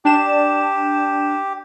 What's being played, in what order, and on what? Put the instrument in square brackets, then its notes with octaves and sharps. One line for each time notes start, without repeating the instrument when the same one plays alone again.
[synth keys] D4 E7 [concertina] G4